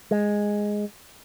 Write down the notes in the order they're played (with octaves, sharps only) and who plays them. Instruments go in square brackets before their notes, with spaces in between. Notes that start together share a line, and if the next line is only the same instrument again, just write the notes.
[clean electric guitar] G#3